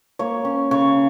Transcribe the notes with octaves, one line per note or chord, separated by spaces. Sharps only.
A#3 C#5
C#4
C#3 C#5